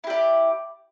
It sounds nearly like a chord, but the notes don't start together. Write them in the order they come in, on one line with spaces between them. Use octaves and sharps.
E4 G4 D5